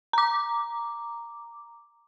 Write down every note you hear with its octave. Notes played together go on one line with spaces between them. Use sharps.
A#5 D6